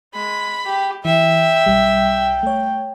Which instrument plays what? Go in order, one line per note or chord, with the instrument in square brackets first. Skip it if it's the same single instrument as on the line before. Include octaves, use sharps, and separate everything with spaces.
[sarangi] G#3 [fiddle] B5
[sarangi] G4
[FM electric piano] E3 [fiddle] E5 [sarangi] G5
[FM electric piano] B1 G3
A3 C#5